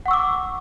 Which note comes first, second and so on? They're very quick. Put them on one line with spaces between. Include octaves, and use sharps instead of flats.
F#5 C#6 E6 D6